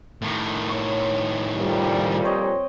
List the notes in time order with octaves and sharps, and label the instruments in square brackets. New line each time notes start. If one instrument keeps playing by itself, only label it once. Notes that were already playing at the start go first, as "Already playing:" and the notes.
[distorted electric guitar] A2 D#3
[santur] C#5 C#6
[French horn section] F2 A#2 G3
[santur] C4 C#5 D#5